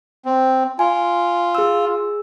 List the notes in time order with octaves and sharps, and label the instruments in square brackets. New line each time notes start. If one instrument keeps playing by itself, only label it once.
[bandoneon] C4
[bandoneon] F4 [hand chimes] G#5
[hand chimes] G#4 E6